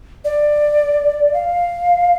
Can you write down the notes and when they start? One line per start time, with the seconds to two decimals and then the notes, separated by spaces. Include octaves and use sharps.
0.24 D5
1.34 F5